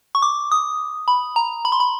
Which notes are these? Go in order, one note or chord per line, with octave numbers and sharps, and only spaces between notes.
C#6
D6
D#6
B5
A#5
B5
C6
B5